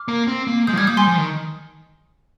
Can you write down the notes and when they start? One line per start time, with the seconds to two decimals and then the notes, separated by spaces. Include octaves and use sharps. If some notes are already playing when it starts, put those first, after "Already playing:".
Already playing: D6 F6
0.08 A#3
0.28 C4
0.47 A#3
0.67 G#3 D#6 G6
0.73 F3
0.77 G3 F6 G#6
0.87 A#3 D#6 G6
0.97 G3 G#5 C6
1.07 F3
1.17 D#3